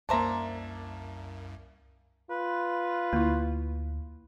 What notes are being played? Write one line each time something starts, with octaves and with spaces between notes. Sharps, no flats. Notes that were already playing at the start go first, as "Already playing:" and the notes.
C2 F#2 A#3 D4 C5 E5 A5 A#5
F4 B4
D2 A#3 E4